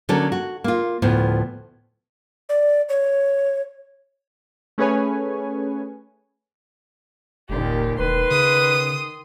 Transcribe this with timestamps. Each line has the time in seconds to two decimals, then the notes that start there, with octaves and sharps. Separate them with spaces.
0.09 D3 F#3 A#3 C#4 A4
0.32 F#4
0.64 A#3 F4
1.02 D2 A2 F3 B3
2.49 D5
2.89 C#5
4.78 A3 C#4 G#4 B4 C#5 G#5
7.49 F#1 D#2 A#2 G4
7.99 E1 D#3 B4 C6
8.31 C#3 D#6